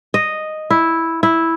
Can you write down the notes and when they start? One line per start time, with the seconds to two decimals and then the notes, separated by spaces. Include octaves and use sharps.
0.14 D#5
0.70 E4
1.23 E4